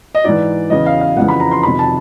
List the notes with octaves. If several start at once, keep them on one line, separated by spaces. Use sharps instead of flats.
D#5
G#2 E3 D5
E2 C#3 E3 D#5
F5
F5
F2 C#3 E3 F#5
B5
A#5
C6
F2 C3 D#3 B5
A5